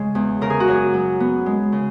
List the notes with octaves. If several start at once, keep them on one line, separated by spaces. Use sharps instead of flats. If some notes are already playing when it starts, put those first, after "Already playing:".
Already playing: C#3 G#3 G#4
E2
C#3 A#4
G#4
F#4
F#2 G#4
F#3
B3
G#3
C#3